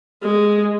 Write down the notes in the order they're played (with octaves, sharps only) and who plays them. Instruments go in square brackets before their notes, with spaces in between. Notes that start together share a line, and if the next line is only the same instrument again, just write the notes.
[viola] G#3